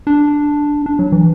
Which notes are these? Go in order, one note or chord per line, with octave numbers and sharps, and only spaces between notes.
D4
D4
F#3
E3